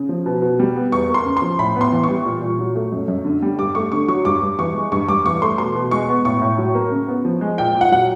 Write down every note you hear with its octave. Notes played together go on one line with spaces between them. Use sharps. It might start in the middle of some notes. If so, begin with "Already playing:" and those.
Already playing: C#3
F3
B2
B2
G3
B3
E2 C#6
A#3
C6
C#3
C6
F3
A2 B5
B3
C6
E3
C#6
G3
A#2
A#2
F#3
A3
F#2
F#2
D3
G3
G2 D6
A3 C#6
D3 C#6
F#3 C#6
G2 D6
G2
E3 C#6
G#3
G2 C#6
G2 D6
E3 C#6
A3 C6
B2 C6
B2
G#3 C#6
B3
A2 C#6
A2
F#3
A#3
C#3
B3
F3
G#3
A#2 G5
A#2
F#5
F#3 F#5